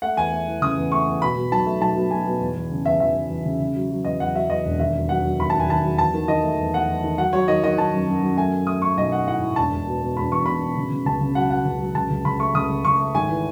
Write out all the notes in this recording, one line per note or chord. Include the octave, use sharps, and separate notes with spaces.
A3 F#5
E2 G#5
A3
E3
C#3 D#6
E2
A3 C#6
E2
B2 B5
B2
B1 A5
A3
B1 A5
B2
B2 G#5
B2
E2
E2
C#3
E2 E5
E2 E5
E2
E2
C#3
C#3
F#3
F#3
E2 D#5
E2 F#5
F#3 E5
E2 D#5
E1
D#2 E5
F#3
F#3 F#5
F#3
D#2 B5
D#2 A5
G#5
D#2 A5
F#3
E2 A5
D#3
D#3 D#5
A3
E2
A3 F#5
E2
D#3
F#3 F#5
F#3 C#5
D#3 D#5
D#3 D#5
D#3 A5
F#2
F#2
F#2
A3 G#5
A3
A3 D#6
A3 C#6
B1 D#5
A3 F#5
A2 F#5
A2
E1 A5
E1
B2
B2
E1 B5
E2 C#6
B2 B5
B2
C#3
C#3
C#2 A5
C#3
F#3 F#5
F#3 F#5
C#2
F#3
C#2 A5
C#2
C#2 B5
A3 C#6
C#2 D#6
C#2
C#2 C#6
A3
G#1 G#5
E3